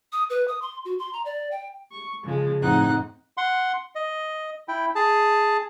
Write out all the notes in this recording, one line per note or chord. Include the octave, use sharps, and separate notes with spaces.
D#6
B4
D#6
C6
F#4
C6
A#5
D5
G5
C#6
C#3 F3 G#3
F2 A2 C4 D#4 F#5 F#6
F#5 C6
D#5
E4 G5
G#4 A5